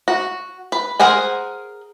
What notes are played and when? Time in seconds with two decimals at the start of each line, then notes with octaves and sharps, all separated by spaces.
0.08 F#4
0.72 B4
1.00 G#4 A#4 C5 F#5 G#5